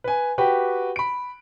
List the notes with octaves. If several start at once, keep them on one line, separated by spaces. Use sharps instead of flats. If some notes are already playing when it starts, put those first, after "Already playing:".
B4 G#5
F#4 G4 B4 G5
B5 D7